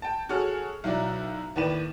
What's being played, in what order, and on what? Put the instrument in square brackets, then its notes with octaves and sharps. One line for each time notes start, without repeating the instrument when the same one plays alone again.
[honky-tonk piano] G5 A5
F#4 G#4 A4 C#5 F6
B1 F#3 E4 D5
D#2 A2 B4 D5 E7